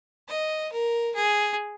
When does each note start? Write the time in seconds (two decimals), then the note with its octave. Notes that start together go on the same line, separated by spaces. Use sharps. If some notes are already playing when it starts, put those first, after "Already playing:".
0.29 D#5
0.72 A#4
1.15 G#4